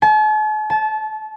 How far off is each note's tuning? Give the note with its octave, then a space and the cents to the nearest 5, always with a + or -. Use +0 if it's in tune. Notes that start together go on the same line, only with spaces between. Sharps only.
A5 -45
A5 -25